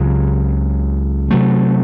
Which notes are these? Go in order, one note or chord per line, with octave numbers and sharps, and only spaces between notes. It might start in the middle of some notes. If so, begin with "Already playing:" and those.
Already playing: C#2 C#3 F#3 C4
C3 F#3 A3